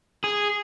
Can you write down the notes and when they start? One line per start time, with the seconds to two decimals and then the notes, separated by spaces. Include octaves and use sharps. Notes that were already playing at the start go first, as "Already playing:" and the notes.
0.24 G#4